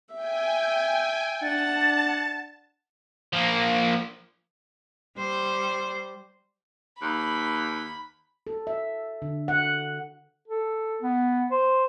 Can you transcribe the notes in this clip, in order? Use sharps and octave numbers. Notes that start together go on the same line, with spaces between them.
E5 G5 G#5
D4 F#5 A5 A6
F3 A#3
G3 C5
D#2 B5
A4
E5
D3
F#5
A4
B3
C5